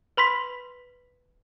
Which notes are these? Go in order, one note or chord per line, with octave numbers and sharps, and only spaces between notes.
B4 B5 C6 B6